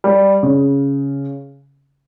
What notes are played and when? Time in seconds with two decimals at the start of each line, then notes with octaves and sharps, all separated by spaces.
0.04 G3
0.43 C#3